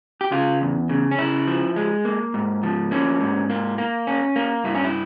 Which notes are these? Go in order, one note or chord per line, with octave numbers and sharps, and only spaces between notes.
G4
C#3 F4
E2
C#3
C#4
C#3 E4
F3
G#3
A#3
G#2
F3
A#3 C#4
G#2
A#3
A#3
C#4
A#3
G2 E4
C#4
E4